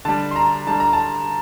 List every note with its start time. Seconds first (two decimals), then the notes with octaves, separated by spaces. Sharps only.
0.05 D3 G3 A5
0.31 C6
0.36 A#5
0.67 D3 G3 A5
0.80 A#5
0.93 A5